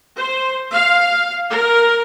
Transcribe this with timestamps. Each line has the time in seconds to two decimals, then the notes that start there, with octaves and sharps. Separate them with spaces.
0.18 C5
0.73 F5
1.51 A#4